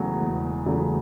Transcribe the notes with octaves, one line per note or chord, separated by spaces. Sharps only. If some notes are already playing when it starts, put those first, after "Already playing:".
Already playing: E1 E2 C#3 F#3 A3
E1
E2 C#3 F#3 A3